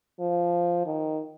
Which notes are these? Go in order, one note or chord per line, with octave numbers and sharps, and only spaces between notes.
F3
D#3